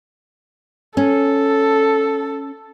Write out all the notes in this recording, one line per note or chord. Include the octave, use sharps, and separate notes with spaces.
C#4 A4